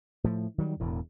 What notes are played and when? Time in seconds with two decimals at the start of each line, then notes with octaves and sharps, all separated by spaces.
0.24 A2 F3 A3
0.58 D#3 F#3 G3
0.80 E1 E2 A2